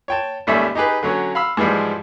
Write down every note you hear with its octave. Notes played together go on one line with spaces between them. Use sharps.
C#5 G5 A5
G#1 D#2 G3 A3 C#4 E5
D#4 G4 G#4 B4
D3 F#3 C#4
F5 B5 E6
G#2 E3 F3 G3 G#3